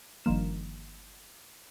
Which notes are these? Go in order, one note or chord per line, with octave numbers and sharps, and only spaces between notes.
G1 D#3 F3 A#3 E7